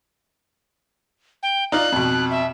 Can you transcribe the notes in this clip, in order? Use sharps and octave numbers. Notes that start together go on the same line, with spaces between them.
G5
D#4 F4 D5 F#6
F2 B2
E5